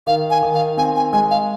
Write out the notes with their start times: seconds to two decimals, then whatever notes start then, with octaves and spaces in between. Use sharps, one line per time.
0.07 D#3 F5
0.30 G#5
0.43 D#3
0.54 F5
0.77 C4 G#5
0.96 G#5
1.13 G#3 G#5
1.31 F5